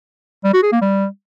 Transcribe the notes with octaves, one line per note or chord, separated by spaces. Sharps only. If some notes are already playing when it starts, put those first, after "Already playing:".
G3
F#4
G#4
A#3
G3